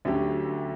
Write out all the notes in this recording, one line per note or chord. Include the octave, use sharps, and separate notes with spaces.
D2 D3 F#3 C#4 G4